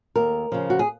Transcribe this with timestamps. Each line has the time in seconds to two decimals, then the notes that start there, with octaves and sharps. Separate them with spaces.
0.16 D#2 A#4
0.52 C#3 F3
0.70 F#4
0.79 G#4